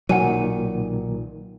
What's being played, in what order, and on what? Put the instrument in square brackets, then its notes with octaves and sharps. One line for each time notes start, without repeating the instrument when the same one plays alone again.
[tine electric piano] B1 A#2 D#3 [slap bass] F#3 [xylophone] F#5 G#5 D#7